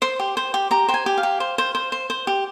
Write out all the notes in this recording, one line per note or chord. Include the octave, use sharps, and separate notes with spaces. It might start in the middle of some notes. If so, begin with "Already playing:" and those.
C5 C6
G4
C5
G4
G4 A#5
C5 G5
G#5
G4
F5
G4
C5
C5
C5
C5
C5
G4